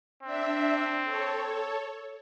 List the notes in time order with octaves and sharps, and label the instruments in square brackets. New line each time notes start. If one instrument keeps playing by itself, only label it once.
[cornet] C4 [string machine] D4 E5
[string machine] A4 C#5